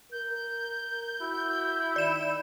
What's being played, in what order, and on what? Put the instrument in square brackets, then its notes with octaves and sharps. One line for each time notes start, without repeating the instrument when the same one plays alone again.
[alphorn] A#4 [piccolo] G6
[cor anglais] E4 [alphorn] F#4
[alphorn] D#3 [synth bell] D5 E7